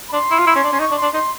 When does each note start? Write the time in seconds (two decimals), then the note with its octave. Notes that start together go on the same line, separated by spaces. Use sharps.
0.09 B5
0.13 D4 C6
0.31 E4
0.39 F4
0.47 E4
0.55 C#4
0.64 D4
0.73 C#4
0.80 D#4 C#6
0.91 D4
0.97 C6
1.02 D4
1.14 D#4 C6